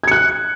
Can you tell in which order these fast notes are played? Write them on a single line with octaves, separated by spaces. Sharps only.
G#6 C#7 F#6